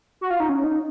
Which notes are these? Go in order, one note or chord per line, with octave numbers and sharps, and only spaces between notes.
F#4
F4
D#4
C#4
D#4